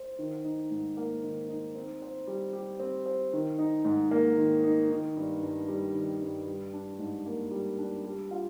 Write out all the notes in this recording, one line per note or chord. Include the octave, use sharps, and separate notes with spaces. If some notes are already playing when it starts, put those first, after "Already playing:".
Already playing: C5
D#3
D#4
G#2
A#3
D#3
D#4
C4
C5
G3
G4
C4
C5
D#3
D#4
G#2
A#3
D#3
D#4
D#3
G2
G2
G3
D#3
G2
G3
D4
G#2
A#3
G3
D4
G3
F4